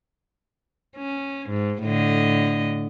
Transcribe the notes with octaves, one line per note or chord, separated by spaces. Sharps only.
C#4
G#2
A2 D3 D#5